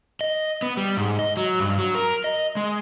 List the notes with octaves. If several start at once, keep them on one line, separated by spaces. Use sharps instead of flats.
D#5
B3
G3
G#2
D#5
F#3
G2
F#3
A#4
D#5
G#3